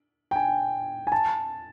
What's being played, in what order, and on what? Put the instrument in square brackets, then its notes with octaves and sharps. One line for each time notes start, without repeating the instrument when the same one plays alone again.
[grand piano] G5
G#5
G#5
A5